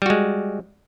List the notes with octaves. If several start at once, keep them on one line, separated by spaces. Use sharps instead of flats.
G3 G#3 F#4